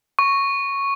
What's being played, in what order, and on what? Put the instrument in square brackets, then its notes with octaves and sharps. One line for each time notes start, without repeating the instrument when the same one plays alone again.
[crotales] C#6